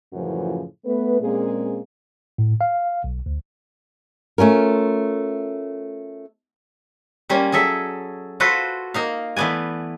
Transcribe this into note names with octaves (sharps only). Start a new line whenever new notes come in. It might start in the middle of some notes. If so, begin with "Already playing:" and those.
F#2 A2 C#3 E3 F3
A3 B3 B4
A#2 G#3 A#3 C4 C#4 G#4
A2
F5
B1
D2
A3 C#4 F4 A#4
G3 A#3 C#4 F4
F#3 G#4 A4 E5
F4 F#4 A4 B4 C5
A#3 D#4 F5
E3 A3 B3 D5 G#5